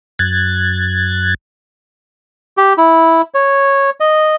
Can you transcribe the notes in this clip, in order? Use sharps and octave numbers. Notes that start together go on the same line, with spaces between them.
F#2 F#6 G#6 A6
G4
E4
C#5
D#5